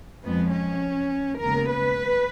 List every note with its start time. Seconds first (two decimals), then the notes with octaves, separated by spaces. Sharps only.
0.23 F2 F3 G#3 B3
0.52 C#4
1.40 D#2 C#3 G#3 B3 A#4
1.70 B4